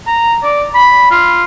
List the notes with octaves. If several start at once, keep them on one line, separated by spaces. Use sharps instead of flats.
A#5
D5
B5
F4